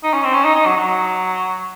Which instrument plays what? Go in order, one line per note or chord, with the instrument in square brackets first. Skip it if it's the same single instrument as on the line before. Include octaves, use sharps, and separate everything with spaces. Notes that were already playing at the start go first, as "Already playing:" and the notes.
[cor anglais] D#4
C#4
C4
C#4
D#4
D#4
F#3
F#3